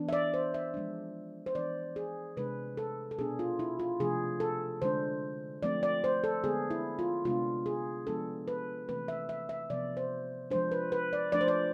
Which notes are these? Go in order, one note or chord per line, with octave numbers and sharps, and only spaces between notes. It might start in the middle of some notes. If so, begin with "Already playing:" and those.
Already playing: E3 B3 D4
E5
D5
C5
E5
F3 G#3 D4
C5
E3 B3 D4 D5
G#4
C3 G#3 D4 B4
A4
A4
B2 B3 D4 G#4
F4
E4
F4
C3 F3 A3 D4 G#4
A4
D3 G#3 D4 C5
F3 A3 C4 D5
D5
C5
A4
D3 G#3 B3 G#4
E4
F4
C3 G#3 B3 D4 F4
G#4
F3 G#3 B3 D4 A4
B4
C3 E3 A3 C4 B4
E5
E5
E5
C3 F3 B3 D5
C5
F3 G#3 D4 C5
B4
B4
D5
F3 A3 D4 D5
C5
D5